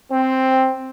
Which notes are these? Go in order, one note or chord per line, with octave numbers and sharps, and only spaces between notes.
C4